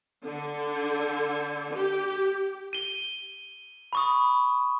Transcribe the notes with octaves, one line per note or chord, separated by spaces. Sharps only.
D3
G4
D#7 G7
B5 C#6 D#6